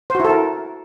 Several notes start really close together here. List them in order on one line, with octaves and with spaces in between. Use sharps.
C5 F#4 E4 A4 A#4